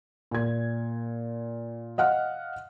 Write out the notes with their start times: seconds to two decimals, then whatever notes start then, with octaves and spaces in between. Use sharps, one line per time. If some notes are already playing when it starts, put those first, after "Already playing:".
0.31 A#2 G#6
1.98 D#5 F5 F#5 F6